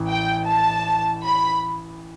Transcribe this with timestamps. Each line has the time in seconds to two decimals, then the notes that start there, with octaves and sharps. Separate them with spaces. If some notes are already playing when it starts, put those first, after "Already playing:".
Already playing: A1 E3
0.09 G5
0.47 A5
1.24 B5